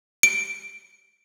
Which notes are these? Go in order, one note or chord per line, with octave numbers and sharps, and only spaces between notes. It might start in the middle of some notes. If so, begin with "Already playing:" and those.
D7